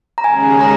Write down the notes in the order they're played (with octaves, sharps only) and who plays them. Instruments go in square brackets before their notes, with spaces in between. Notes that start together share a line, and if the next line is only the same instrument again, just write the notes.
[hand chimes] A#5
[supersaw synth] D#2 C#3 G#3 C#4 G#4 [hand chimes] G#5
[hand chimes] A#5